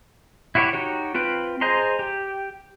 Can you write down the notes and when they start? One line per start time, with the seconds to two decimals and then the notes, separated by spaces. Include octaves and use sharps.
0.55 E4 F#4 G4 C#5 B5
0.73 D#4 F#4 G4 C#5
1.15 C4 F4 B4 G5
1.61 G#4 C5 D#5 A#5 C6
1.99 G4